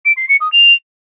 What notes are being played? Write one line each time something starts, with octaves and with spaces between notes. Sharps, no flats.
D7
C7
C#7
D#6
F7